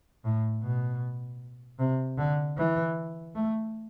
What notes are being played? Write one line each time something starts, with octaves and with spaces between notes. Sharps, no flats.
A2
B2
C3
D3
E3
A3